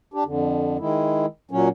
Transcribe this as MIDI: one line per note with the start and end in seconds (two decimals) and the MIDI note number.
0.14 0.24 62
0.14 0.24 67
0.25 0.77 41
0.25 0.77 50
0.79 1.26 51
0.79 1.26 56
0.79 1.26 64
1.51 1.69 46
1.51 1.69 54
1.51 1.69 61